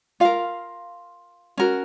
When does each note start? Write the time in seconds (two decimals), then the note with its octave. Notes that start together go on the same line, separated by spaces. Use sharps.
0.20 F4 A#4 F5
1.58 C#4 F#4 A#4